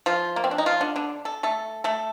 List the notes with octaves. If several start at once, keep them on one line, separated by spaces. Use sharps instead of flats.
F3 F4
A#3
C4
D4
D#4
F3 F4
D3 D4
D3 D4
A4
A3 A4
A3 A4